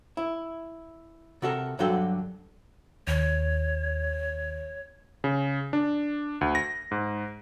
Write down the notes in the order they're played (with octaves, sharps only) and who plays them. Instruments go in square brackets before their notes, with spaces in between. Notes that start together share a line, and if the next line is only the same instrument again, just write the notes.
[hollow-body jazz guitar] E4
C3 F#4 A4 A#4
G2 D3 F#3 F#4 A4 G5
[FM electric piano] D#2 [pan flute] C#5
[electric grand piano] C#3
D4
D2
A#6
G#2